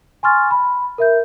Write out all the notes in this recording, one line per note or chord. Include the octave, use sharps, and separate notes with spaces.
G#5 C6 C#6 F6 A6
B5
A#4 E5 G6